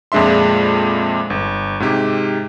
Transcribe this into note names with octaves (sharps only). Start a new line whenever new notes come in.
F2 A#2 G#3 D4 E5 C6
G1
G#2 C3 G4